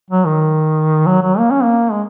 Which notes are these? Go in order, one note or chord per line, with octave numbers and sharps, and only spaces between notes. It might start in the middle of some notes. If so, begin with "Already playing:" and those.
F#3
D#3
F#3
F#3
A#3
C#4
A#3
G#3